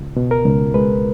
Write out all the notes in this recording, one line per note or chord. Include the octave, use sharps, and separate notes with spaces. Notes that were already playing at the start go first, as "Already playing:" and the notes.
Already playing: C#2
B2
A#4
C#2
G#3 B4